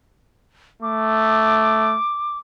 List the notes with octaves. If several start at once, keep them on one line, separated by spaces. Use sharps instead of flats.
A3 D6